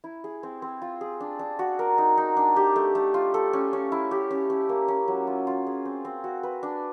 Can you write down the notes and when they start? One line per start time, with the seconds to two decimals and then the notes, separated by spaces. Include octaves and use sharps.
0.04 E4
0.24 G#4
0.43 C4
0.62 C4
0.82 F4
1.01 G#4
1.20 D4
1.39 D4
1.59 F#4
1.79 A#4
1.98 D#4
2.18 D#4
2.37 D4
2.56 G4
2.76 A3
2.95 A3
3.14 F4
3.34 A4
3.53 C#4
3.73 C#4
3.92 E4
4.11 G4
4.31 C#4
4.50 C#4
4.69 A#3
4.88 C#4
5.08 F#3
5.27 F4
5.47 F4
5.67 G#4
5.85 C4
6.05 C4
6.24 F#4
6.43 B4
6.63 D4